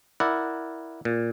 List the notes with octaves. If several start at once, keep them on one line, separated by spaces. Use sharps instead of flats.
E4 A#4 D5 F#5
A#2